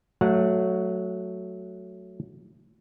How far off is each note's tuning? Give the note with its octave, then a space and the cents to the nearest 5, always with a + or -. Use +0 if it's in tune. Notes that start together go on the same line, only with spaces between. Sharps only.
F#3 +0 A3 +0 F#5 -25